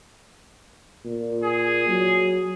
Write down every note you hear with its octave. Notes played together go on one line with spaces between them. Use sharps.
A#2
G#4
F#3